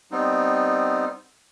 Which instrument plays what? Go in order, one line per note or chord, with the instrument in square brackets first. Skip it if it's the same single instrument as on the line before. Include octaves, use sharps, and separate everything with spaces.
[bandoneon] G3 B3 C4 D#4